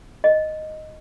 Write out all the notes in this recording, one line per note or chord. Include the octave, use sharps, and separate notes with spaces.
D#5